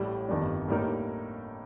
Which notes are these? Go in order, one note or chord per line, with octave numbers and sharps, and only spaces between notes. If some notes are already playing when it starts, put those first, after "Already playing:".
Already playing: A1 A2 G3
G1 F2 D#3 G3 D4
A2 G3 A#3 D#4 A#4